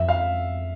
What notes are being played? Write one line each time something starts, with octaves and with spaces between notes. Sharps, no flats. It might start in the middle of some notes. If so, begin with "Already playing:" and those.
Already playing: F2 E5
F5